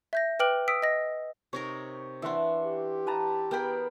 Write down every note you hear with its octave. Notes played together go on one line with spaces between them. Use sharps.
E5 G6 A#6
B4 G5 D6 F6 D7 F#7
D#6 E6 B6 D7
D#5 A#6
C3 D#4 A#4 C#5
E3 D4 E5 F#5 C6
G4
B4 A5 A#5
B3 G#4 A#4 G5 B5